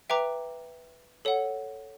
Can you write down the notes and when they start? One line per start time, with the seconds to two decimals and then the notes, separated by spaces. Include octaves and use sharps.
0.10 B4 E5 G5 A#5 D6
1.25 A4 C#5 F#5